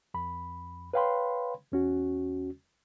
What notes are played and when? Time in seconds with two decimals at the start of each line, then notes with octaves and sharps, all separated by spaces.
0.14 F2 B5
0.93 B4 C#5 F5 G5 B5 C6
1.72 E2 C#4 F#4